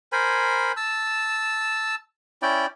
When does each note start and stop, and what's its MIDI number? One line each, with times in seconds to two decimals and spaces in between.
0.12 0.72 70
0.12 0.72 72
0.12 0.72 80
0.12 0.72 83
0.77 1.95 81
0.77 1.95 88
2.42 2.66 61
2.42 2.66 64
2.42 2.66 74
2.42 2.66 79